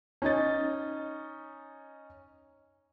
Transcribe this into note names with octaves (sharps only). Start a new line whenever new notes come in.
C#4 D#4 D#5 A6